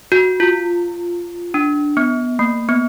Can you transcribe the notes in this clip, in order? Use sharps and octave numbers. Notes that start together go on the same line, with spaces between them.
F#4
F4
D4
B3
A#3
B3